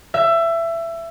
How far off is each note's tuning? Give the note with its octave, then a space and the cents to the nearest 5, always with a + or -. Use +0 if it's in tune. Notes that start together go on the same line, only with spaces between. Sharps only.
E5 +20